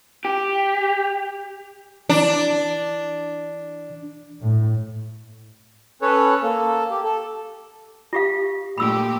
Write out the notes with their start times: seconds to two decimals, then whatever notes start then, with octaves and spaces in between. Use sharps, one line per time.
0.25 G4
2.09 E3 D4
4.42 A2
6.02 C#4 A4 B4 C#5
6.43 A#3 A4
6.90 G4
7.04 A4
8.13 F4 G4 F5
8.78 A#2 A3 G4 B5 E6